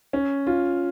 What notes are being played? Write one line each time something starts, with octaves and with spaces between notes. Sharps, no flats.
C#4
F4